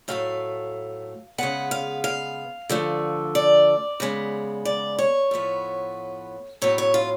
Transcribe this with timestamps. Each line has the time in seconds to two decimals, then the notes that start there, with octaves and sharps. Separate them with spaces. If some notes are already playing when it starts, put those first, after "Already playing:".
0.08 A2 F#3 A3 F5
1.38 C#3 G#3 B3 F#5
1.71 F5
2.04 F5
2.69 D3 F3 A3
3.35 D5
4.00 C#3 G#3 B3
4.65 D5
4.99 C#5
5.31 A2 F3 B3
6.62 A2 F#3 B3 C#5
6.78 C#5
6.94 F4